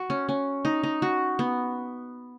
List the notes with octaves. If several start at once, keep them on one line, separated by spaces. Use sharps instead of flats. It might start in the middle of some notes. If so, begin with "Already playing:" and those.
Already playing: F#4
C#4
C#4
D#4
D#4
F#4
B3